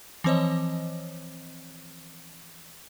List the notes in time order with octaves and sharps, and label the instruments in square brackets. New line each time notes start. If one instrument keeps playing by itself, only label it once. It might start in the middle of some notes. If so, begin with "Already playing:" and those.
[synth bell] E3 F3 C4 C5 C#5 D#5